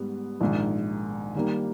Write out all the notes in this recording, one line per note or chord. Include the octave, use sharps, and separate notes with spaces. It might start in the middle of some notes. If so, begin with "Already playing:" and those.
Already playing: G#2 G3 B3
A#1 G#2 D#3
D#3 G3 A#3